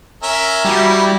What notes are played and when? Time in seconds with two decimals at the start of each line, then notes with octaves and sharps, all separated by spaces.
0.23 C#4 A#4 E5
0.65 G3 E4 F#4 G4